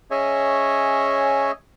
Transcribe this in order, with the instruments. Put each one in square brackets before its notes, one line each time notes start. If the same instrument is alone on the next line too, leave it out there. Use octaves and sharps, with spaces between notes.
[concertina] C#4 G#4 C#5 D#5 E5 G#5